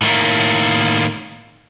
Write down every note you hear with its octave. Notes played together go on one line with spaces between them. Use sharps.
A2 D#3 A3 A#3